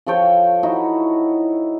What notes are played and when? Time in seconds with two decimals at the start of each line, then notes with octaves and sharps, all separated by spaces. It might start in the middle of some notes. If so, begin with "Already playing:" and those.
0.06 F3 A4 C#5 G5
0.63 D#4 E4 F#4